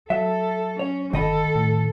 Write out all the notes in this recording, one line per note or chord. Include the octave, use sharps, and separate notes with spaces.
F#3 A4 E5
C#4 C#5
G1 D#3 A4 D#5 B5
A2